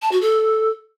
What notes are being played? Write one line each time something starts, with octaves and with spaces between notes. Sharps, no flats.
A5
F#4
A4